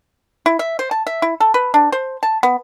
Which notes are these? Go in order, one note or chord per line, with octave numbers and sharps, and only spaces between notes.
E4
E5
C5
A5
E5
E4
A4
B4
D4
C5
A5
B3